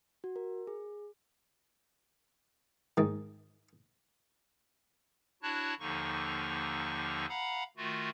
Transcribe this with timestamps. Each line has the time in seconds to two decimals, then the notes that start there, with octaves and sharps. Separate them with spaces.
0.24 F#4
0.36 A#4
0.67 G#4
2.97 G#2 D#3
5.43 D4 E4 F#4 C#5 A5 F#6
5.80 D#2 D3 F3 A#3 D#4 C#6
7.29 F5 F#5 A#5 B5
7.77 D#3 A3 F4 F#4